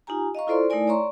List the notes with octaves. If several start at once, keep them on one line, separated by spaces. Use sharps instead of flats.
D#4 F4 G4 G#5 A#5
D#5 F5 A#5 C#6
E4 F4 A4 C5 D5 C6
A3 D#4 E4 A#4 D5 G#5
C#5 D5 E5 A#5 C6 C#6